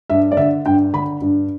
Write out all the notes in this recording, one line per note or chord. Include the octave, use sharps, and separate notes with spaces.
G2 E5
D5
D3 E5
G2 G5
D3 B5
G2